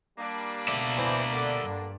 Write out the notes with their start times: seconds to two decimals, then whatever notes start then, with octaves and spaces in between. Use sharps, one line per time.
0.19 G3 A#3 D4
0.68 B2 D5 E5
0.98 E3 C4 E4
1.33 D3
1.62 G2